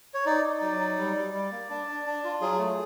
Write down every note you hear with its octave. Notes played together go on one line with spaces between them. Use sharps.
C#5
D#4 D5
D#4
F#3
D#4
G3
G3
G3
A#3
D4
D4
D4
F4
F#3 G#4
A3